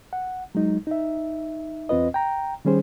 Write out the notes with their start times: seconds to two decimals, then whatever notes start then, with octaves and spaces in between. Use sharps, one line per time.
0.13 F#5
0.55 F#3 G#3 D#4
0.87 D#4 E5
1.89 E2 C4 F4 B4 D#5
2.14 G5 A#5
2.65 D#3 G3 C#4 G#4 C5